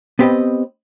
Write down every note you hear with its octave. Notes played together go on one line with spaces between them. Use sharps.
B3 C4 G4 A4 B4 D#5